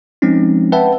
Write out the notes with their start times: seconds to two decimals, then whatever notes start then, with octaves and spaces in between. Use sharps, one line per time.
0.22 F3 G#3 C4 C#4 D#4
0.72 B4 E5 F#5 G5 A5